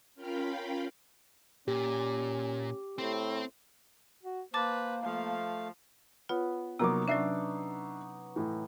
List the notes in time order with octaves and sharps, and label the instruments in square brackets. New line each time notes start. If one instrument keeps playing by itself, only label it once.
[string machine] C#4 F4 A#4 F5 G5 B5
[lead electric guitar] A#2 [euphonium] C#4 [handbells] G4
[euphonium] A2 [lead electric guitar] C4
[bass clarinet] F#4
[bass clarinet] A#3 [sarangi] B4 [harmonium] C5 [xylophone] A5 D6 A6
[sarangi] F3 [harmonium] A3 F5
[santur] B3 [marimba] F4 C#5
[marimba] C3 [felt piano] F#3 A#3 B3 [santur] D#4 C#5 D6
[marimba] F#3 C#4 [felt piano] D4 E5 C7
[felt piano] A2 E3